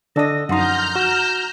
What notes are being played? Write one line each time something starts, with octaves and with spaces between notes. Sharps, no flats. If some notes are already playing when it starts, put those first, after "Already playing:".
D3 D4 A4 D#5 A#6
F#2 F3 D#4 F#5 A#5 C6 F6 G6
F#4 E7